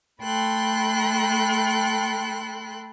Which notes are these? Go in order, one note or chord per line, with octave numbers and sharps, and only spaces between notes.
A3 A4 G5 B5 C6 F#6